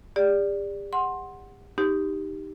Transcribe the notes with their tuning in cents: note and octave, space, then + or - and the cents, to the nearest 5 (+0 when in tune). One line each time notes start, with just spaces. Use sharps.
G4 +45 D5 -5
F#5 +0 C6 +15
D#4 +0 G4 +0 C6 -45